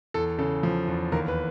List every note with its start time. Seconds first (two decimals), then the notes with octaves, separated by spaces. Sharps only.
0.14 E2 A4
0.38 C#3 A4
0.63 F3
0.88 E2
1.12 D#2 A#4
1.28 B4